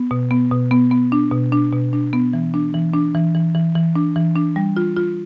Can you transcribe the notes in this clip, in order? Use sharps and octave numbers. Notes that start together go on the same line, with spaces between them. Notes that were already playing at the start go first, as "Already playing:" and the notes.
Already playing: B3
B2
B3
B2
B3
B3
D4
B2
D4
B2
D4
B3
E3
D4
E3
D4
E3
E3
E3
E3
D4
E3
D4
G3
F4
F4